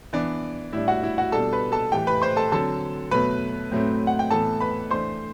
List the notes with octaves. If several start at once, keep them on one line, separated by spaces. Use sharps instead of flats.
E3 B3 D4 D5
A2 G3 D4 E4 E5
F#4 F#5
E4 E5
F#4 F#5
B2 G3 D4 A4 A5
B4 B5
A4 A5
A2 E3 A3 G4 G5
B4 B5
C5 C6
A4 A5
D3 F#3 C4 A4 A5
B2 F#3 A3 B4 B5
A2 F#3 A3 C4
F#5
G5
A2 E3 B3 A4 A5
B4 B5
E3 A3 D4 C5 C6